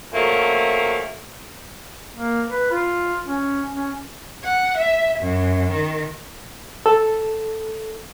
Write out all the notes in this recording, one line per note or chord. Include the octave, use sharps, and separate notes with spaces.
A#2 C#3 F3 F#3 A3 A#3
A#3
B4
F4
C#4
C#4
F#5
E5
F#2
D#3
A4